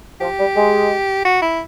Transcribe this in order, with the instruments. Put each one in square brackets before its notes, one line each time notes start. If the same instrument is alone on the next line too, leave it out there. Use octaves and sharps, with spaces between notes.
[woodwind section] F3 [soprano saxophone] G4
[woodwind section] G3
G#3
[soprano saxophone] F#4
E4